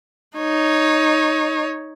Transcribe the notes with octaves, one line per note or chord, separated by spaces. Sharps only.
D#4 C#5